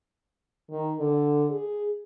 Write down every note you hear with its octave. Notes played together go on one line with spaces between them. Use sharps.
D#3
D3
G#4